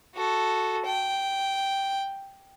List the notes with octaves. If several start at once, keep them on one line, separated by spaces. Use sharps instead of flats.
F#4 A4
G5